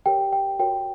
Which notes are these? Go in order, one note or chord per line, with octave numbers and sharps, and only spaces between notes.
G4 A#4 C#5 G5
G5
F#4 A#4 C#5 G5